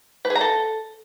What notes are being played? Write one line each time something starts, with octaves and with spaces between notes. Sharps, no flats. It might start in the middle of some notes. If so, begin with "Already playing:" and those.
B4
G#4
A#5
A4